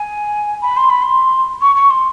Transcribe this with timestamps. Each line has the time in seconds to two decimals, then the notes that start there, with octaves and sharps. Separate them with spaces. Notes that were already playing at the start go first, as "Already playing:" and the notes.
Already playing: G#5
0.62 B5
0.77 C6
0.90 B5
1.02 C6
1.62 C#6
1.76 C#6
1.91 C6